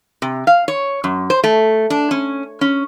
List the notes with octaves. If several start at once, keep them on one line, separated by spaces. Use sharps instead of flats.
C3
F5
C#5
F#2
C5
A3
D4
C#4
C#4